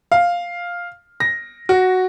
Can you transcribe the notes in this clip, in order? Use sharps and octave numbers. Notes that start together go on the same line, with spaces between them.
F5
A#6
F#4